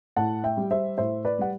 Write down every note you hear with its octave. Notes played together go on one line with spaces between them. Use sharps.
A2 F#5 A5
E5 G5
G3
C5 E5
A2 C5 E5
B4 D5
G3 F#5